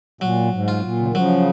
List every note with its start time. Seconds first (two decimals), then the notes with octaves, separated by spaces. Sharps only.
0.21 A#2 F#3
0.53 G#2
0.68 F4
0.83 A#2
0.99 C#3
1.08 D#3
1.15 C#3 F3 F#3